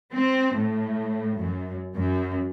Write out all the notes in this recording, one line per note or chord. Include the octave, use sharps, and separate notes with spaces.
C4
A2
F#2
F#2